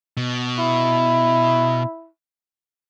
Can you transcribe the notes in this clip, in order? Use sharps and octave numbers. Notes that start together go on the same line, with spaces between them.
B2
E4